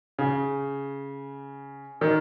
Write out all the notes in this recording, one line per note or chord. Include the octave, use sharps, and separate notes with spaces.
C#3
D#3